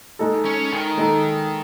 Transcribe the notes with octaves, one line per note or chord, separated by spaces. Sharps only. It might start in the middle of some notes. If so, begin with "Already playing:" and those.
G#3 D#4 A4
C#4
D#3
G#3 D#4 A4